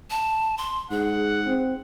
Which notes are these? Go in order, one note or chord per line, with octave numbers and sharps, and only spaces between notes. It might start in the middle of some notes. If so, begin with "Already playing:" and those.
A5
C6
G#2 G#4 F#5
C4